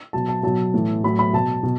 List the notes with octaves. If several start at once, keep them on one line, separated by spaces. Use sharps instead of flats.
B2 F#3 A5
A5
B2 F#3 A5
A2 E3
A2 F#3 B5
B5
B2 F#3 A5
B2